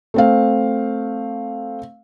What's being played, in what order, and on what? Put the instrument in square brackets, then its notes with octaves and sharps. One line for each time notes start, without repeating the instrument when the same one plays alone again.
[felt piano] A3 C4 F5